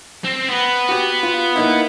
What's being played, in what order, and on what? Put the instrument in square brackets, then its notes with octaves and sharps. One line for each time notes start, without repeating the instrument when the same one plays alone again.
[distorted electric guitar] C4
B3 B4
[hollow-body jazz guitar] F#4 G4
F4
A#3 D#4 E4